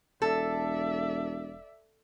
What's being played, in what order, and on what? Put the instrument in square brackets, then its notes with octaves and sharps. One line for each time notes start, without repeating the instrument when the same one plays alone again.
[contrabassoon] E1 [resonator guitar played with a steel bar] A4 [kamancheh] D5 E5